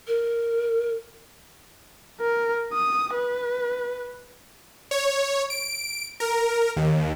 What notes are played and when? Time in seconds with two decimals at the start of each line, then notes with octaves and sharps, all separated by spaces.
0.08 A#4
2.21 A#4
2.73 D#6
3.14 B4
4.91 C#5
5.50 D7
6.20 A#4
6.76 D#2